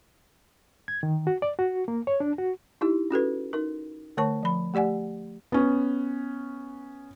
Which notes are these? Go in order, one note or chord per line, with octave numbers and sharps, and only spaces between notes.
G#6
D#3
F#4
D5
F#4
A#3
C#5
D4
F#4
D#4 E4 G4
C#4 F#4 A4 B4
D#4 A#4
D3 A3 A#4 C#5 A5 C#6
F3 B5
A3 G4 D5 F#5 G#5
B3 C#4